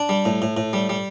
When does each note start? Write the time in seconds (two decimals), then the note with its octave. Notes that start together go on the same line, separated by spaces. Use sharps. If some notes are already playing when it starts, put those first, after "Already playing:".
Already playing: D4
0.09 G3
0.25 A2
0.42 A2
0.57 A2
0.73 G3
0.89 G3